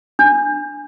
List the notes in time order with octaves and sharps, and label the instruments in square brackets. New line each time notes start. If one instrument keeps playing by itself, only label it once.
[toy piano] D4